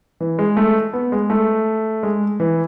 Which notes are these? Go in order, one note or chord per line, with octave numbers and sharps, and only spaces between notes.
E3
G#3
A3
B3
G#3
A3
G#3
E3